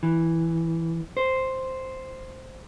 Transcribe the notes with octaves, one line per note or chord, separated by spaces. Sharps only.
E3
C5